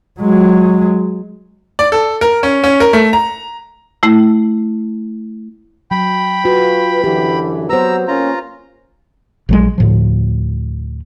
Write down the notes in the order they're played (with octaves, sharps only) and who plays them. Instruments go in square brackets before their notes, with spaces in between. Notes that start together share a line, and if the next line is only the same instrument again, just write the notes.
[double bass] F#3 G#3
[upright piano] D5
A4
A#4
C#4
C#4
A#4
A3
A#5
[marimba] A3 E4
[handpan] F#3 [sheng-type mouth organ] G5 B5
[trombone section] F4 B4 [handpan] F#4
[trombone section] F#2 D3 E3 [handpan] G4
[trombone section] F#3 B3 [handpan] B4 C5 [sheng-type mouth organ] A#5 E6
[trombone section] A#3 C#4 [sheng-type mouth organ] F4 A#5
[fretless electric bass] A#1 F#3 G#3
D2 A2 F3